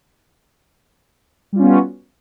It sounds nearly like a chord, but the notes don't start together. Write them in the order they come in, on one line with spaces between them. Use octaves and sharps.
G3 F4 C#4 B3 F#4